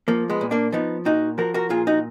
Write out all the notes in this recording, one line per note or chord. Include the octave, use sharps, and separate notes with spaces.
F3 A#3
G#3 B3
A#2
A#3 D4
F3 B3 D#4
A#2 D#4 F#4
F3 F#4 A#4
F#4 A#4
A#2 F4 G#4
D#4 F#4